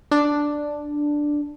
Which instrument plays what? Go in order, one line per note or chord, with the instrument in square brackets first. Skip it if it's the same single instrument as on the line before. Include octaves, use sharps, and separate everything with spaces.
[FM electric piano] D4